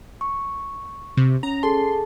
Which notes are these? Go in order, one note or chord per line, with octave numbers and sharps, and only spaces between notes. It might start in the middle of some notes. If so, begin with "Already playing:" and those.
C#6
C3
C#4 A#5
G#4 A4 A5 C6